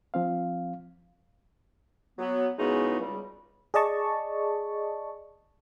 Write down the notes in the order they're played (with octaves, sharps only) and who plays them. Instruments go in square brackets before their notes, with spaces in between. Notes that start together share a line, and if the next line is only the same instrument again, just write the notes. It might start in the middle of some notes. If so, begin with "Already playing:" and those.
[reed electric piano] F3 C4 F5
[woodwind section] F#3 B3
C#3 E3 G#3 B3 D#4 F#4
C#2 G3
[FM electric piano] G#4 D5 D#5 A5 C#6